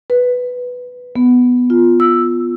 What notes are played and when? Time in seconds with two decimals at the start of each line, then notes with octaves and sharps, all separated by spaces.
0.10 B4
1.16 B3
1.70 F4
2.00 E6